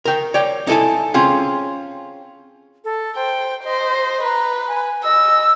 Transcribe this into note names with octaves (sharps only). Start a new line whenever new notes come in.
A#4 G5
C#5 D5 G5
D#4 E4 A4 G#5 A5
C4 C#4 F4 G#4
A4
C5 G5
C5 D#5
B4 A#5
G#5
D#5 E6